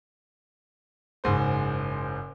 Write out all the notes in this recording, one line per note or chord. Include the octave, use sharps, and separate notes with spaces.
F#1 G#2 C5